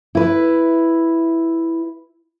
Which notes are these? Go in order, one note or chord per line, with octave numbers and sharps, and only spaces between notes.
E4 B4